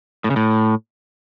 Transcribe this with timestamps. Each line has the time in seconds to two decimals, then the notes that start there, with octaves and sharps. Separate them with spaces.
0.24 A2
0.30 C#3
0.36 A2